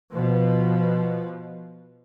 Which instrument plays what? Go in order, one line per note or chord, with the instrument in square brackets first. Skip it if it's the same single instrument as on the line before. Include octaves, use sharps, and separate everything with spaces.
[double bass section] B2 F3